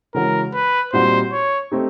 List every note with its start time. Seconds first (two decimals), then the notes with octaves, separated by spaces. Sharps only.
0.14 C#3 E3 G#3 C#4 F#4 A#4
0.54 B4
0.92 A#2 G3 C4 D#4 F#4 C5
1.32 C#5
1.72 A3 C4 D#4 G4